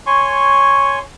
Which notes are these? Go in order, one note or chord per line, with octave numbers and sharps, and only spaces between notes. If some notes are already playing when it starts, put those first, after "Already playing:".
C#5 G#5 C6 C#6